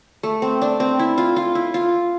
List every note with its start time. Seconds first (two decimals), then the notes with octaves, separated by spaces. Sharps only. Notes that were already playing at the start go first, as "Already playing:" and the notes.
0.23 A3
0.42 C4
0.62 D4
0.80 C4
0.99 E4
1.18 F4
1.36 F4
1.55 E4
1.74 F4